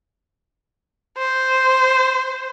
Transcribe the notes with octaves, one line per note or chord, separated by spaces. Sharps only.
C5